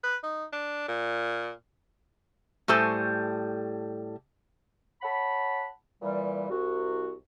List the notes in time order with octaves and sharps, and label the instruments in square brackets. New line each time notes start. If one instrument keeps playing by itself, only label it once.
[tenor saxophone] B4
D#4
D4
A#2
[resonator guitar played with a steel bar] A2 G3 A4 C5 G#5
[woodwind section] C#5 F#5 A5 B5
A#2 E3 G3
C2 F#4